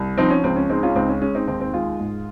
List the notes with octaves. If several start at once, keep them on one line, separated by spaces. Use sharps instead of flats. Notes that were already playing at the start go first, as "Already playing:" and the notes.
Already playing: C2
F3 C4 D#4
C#4
C#2 C4
C#4
G#3 C4 D#4
C#4 F4
C#2 C4 D#4
C#4
G#3 C#4
C4 D#4
D#2 C4 D#4
C4
G#3 F4 G#4
G#2